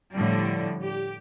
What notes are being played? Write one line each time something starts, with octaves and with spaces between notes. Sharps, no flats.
A2 D3 F3 G3
G4